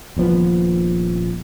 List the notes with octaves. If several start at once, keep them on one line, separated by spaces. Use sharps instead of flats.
D#1 A#1 F3 B3